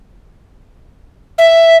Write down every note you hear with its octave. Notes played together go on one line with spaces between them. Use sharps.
E5